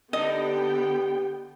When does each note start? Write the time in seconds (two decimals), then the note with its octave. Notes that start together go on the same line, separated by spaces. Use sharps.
0.13 D3 G3 B3 D4 D#4 D#5 G5